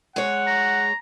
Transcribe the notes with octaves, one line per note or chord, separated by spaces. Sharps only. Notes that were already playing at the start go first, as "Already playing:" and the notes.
G#3 C#5 F#5
A#5